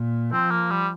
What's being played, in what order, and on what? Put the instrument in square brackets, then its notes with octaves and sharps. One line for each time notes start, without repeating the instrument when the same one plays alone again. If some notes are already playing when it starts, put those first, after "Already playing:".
Already playing: [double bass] A#2
[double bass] F3 [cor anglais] C4
[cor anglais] A#3
G3